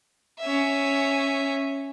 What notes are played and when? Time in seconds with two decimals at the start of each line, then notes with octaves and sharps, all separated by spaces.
0.40 C#4 E5